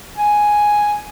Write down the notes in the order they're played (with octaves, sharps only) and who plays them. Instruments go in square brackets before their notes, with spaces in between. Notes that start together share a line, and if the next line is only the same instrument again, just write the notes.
[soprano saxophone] G#5